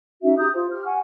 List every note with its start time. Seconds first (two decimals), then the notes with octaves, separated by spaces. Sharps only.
0.22 C#4 D#4 F#4 E5
0.37 G4 A#5 D#6 G6
0.54 F4 C5
0.71 G4 F6
0.86 F#5 G#5 C#6